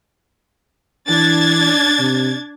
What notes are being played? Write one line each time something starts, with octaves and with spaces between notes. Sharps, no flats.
E3 D4 G#6 A6
C3